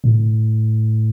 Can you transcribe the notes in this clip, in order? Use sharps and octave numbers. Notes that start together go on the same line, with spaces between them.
A2